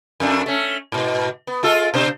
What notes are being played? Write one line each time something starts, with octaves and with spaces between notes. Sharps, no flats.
F2 A3 D4
A3 C#4
G#2 B2
B3
G#3 F4 A4
B2 D4 C5